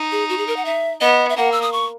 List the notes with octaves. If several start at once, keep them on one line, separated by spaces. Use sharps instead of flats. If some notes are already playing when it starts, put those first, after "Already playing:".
Already playing: D#4
G#4
F#4
G#4
A#4
F#5
E5
B3 D#5
E5
A#3 F#5
E6
D#6
C#6